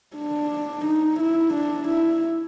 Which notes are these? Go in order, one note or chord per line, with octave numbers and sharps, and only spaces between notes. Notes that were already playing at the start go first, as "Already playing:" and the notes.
D4
D#4
E4
D4
E4